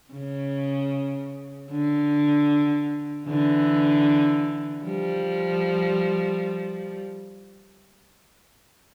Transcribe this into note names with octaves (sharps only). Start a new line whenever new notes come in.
C#3
D3
D3 E3
F3 G3